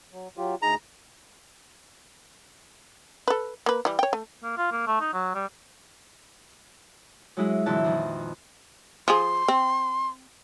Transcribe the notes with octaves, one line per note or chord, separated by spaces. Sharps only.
F#3
F#3 F4 G4
D2 D#4 G#4 A#5
A4 B4
A#3 B4
E3 G3
C#5 G5
A3
A#3
F4
A#3
A3
D#4
F#3
G3
F#3 G#3 E4 G#4
A#2 D3 E3 F#3 B3 A5
F2 D#3
F3 G#4 C6
C4